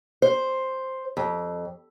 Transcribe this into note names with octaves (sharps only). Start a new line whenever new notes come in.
C5
F2